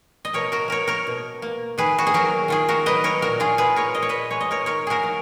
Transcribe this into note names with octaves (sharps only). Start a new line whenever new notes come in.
D#5
B2 A#4 C#5
F#4 A#4
A#3 A#4 C#5
A#4 C#5
B2
A#3
D#3 G#4 B4
F#4
G#4
F#3 A#3 F#4 A#4
D#3 F4 G#4
F#4 A#4
F#3 A#3 B4 D#5
A#4 C#5
A#2 F#4 A#4
F4 G#4
G#3 G#4 B4
A#4 C#5
A#2 D#5
C#5
B4 D#5
G#3 C#5
D#5
A#4 C#5
D#3 A#4 C#5
F#4 G#4 A#4
F#3 A#3